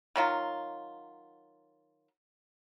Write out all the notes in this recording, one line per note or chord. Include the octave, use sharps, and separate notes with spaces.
D#3 F#3 F4